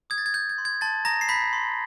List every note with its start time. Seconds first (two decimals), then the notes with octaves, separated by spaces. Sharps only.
0.10 D#6 G#6
0.18 A6
0.26 G#6
0.34 G6
0.49 G#6
0.58 C6
0.65 G#6
0.81 A5 C6 A6
1.05 A#5 D#6 A#6
1.21 C7
1.29 B5 G6 B6
1.53 C6